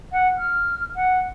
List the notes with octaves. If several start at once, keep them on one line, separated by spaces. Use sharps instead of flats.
F#5
F6
F#5